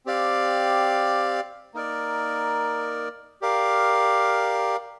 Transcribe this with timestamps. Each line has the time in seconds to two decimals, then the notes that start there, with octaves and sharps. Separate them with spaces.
0.06 C4 G4 D5 F5
1.74 A#3 D#4 A#4 D5
3.41 G4 A#4 D5 F5